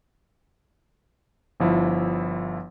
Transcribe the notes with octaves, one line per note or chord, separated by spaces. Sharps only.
G1 F3 E4